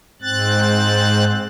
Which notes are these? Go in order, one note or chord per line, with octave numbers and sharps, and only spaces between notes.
G#2 C4 F#6 A6